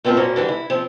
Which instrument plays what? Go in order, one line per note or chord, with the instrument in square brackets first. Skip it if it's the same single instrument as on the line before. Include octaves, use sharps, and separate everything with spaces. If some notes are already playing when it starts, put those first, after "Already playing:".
[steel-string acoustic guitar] A3 B3 C4 F4 A#4 A5
F#2 A#2 A#3 C#4 C5
D3 E3 G3
E4
F3 C4